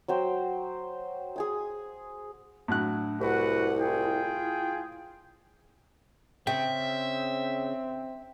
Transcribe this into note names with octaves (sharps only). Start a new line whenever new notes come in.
F#3 C5 G5
G#4 G#5 D#6
A2 F#3 D4 F#6
C2 E4 F#4 B4 F#5
F4 G#4 G5
C#3 C4 E5 G5